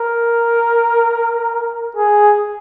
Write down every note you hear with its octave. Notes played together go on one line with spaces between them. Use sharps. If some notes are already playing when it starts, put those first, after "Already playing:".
Already playing: A#4
G#4